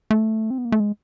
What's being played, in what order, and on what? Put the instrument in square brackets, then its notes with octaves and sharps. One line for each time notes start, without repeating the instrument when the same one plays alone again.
[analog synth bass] A3
C4
B3
A#3
A3
G#3